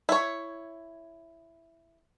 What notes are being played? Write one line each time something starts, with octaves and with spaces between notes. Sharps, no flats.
E4 C#5